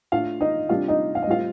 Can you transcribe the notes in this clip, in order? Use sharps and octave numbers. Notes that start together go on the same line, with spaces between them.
A2 A3 D4 F4 F5
D#4 D#5
C3 G3 D4 F4 F5
D#4 D#5
F5
D#5
A2 G3 C4 F4 F5